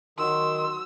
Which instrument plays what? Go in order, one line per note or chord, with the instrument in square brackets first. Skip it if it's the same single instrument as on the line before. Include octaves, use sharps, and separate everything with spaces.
[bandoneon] D#3 [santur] F#3 F#4 [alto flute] C6 [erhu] E6